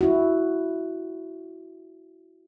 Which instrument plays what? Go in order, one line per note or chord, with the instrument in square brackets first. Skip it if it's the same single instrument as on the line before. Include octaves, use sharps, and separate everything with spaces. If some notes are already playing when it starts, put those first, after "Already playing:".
[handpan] E4 F#4